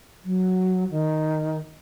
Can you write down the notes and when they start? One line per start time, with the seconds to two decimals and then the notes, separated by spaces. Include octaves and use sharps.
0.25 F#3
0.91 D#3